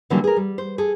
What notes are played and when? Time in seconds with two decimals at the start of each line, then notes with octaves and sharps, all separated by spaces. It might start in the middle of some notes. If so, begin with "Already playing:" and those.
0.10 D3 E3 F#3 G3 A#3 C#4
0.24 G#4 A#4
0.37 G3
0.58 C5
0.78 G#4 A4